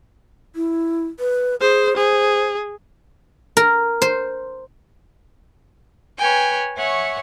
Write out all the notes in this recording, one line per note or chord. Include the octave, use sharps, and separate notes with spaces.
E4
B4
G#4 C5
G#4 C5
A#4
C5
B4 C#5 G5 G#5
C#5 E5 F#5 G#5 C#6